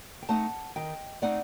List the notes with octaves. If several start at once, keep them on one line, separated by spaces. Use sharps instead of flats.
G5
A3 C4 D#4 F#5 A5
D#3 D#5 G5
A3 C4 D#4 D5 F#5